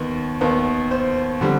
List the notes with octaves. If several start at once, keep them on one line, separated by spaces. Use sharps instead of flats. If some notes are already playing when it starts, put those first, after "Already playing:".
Already playing: D#2 D#3 B3
D#2 D#3 B3
C5
D3 G3 C4